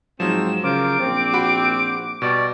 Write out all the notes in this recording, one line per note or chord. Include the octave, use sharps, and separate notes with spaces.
G#2 F3 F#3 C4 E7
C#3 F4 A#4 C5 D6
A#1 C4
F#4 B5
B2 G3 D5 C#6